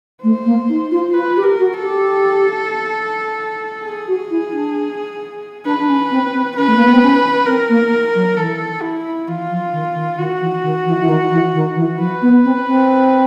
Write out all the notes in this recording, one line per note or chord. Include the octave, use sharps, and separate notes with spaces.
A3 C5
A#3
D#4
F4
F4 B4
G4
A#4
F#4
A4
G4
G#4
F#4
E4
D4
D4 B4
D4
C#4
C4
C4
C#4 B4
A3
A#3
B3
C4
C#4
C4 A#4
A#3
F#3
E3 A4
E4
E3 F4
F3
D#3
D#3
D#3 F#4
E3
D#3
E3
E3
D#3
E3
D#3
E3
F3 B4
B3
C4
C4